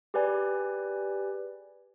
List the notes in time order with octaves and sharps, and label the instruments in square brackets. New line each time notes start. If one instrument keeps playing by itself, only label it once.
[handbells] G4 G#4 B4 D5 G#5